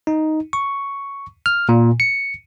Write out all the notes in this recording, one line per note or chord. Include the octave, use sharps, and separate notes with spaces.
D#4
C#6
F6
A#2
C#7